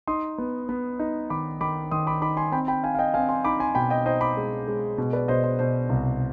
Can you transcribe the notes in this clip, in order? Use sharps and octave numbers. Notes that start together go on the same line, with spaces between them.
D#4 C6 D#6
B3
B3
D#4
D#3 B5 D6
D#3 B5 D6
D#3 C6 D#6
B5 D6
D#4 B5 D6
G#5 C6
C4 G5 B5
G5 B5
D#4 F5 G#5
F5
D#5 G5
C4 F5 G#5
G#5 C6
D#4 B5 D6
G#5 C6
B2 G5 B5
D#5 G5
D#4 C5 D#5
B5 D6
G#3
G#3
B2
B4 D5
B2 C5 D#5
C5
B2 C5
C2